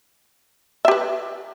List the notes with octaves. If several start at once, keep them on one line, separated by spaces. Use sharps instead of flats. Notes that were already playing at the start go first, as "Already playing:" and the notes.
G4 B4 E5